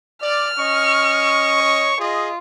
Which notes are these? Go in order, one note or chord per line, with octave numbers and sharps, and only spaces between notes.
D5 F6
C#4 D#5 C#6
C#5
F4 G#4 D#5